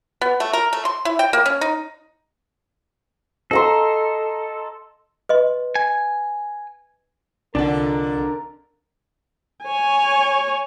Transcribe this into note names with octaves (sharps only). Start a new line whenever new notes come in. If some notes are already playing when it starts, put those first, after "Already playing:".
B3
A3
A#4
A3
C6
E4
G5
A#3
C#4
D#4
A4 D#5 A#5 C6
B4 D#5 C6
G#5
C2 F2 D3 D4 A#4 D5 A5
C#5 G#5